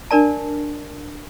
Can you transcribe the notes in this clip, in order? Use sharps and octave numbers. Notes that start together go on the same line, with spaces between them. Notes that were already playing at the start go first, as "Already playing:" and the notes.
D4 A#4 D5 A5